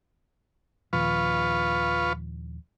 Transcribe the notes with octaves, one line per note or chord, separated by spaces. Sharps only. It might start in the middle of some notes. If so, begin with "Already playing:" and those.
D#2 A#2 F3 F4 B4 C#6